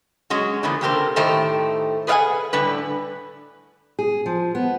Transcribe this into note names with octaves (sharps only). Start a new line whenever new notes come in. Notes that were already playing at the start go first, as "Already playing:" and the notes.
F#3 G#3 C#4 F#4
D3 E3 F3 A#3 B3
A#2 D3 G4 A4 A#4 C5
A2 D#3 A3 G4 C5 A#5
G#4 B4 D5 F5 F#5 G#5
A2 D3 G3 B4
G#4
F3
B3